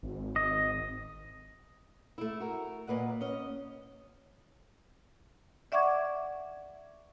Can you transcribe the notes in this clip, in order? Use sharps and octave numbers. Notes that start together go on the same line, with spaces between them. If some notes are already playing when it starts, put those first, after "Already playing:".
G#1
D#5
A3 E4
F#4 A#4
A#2 A#3 B4 D#5 F#5
C#4 D#5
D5 E5 F#5 C#6 D6 G#6